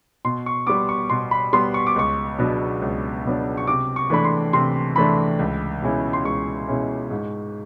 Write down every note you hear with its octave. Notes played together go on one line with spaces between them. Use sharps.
B2 C6
C#6
G3 B3 D6
C#6
B2 C6
B5
G3 B3 C6
C#6
D6
C#2 C#6
B2 F#3 B3 D4
C#2
B2 F#3 B3 D4
C#6
C3 D6
C#6
E3 A3 D4 B5
C6
C3 C6
E3 A3 D4 B5
C#2
B2 G#3 C#4 E4
C6
C#2 C#6
B2 G#3 C#4 E4
G#2